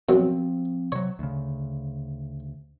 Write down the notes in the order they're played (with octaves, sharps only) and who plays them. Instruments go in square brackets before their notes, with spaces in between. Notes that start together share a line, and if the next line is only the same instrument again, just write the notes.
[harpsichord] F#2 B2 [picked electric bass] F3 C4
[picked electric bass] C3 F#3 [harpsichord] C#5
[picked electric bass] D2 C#3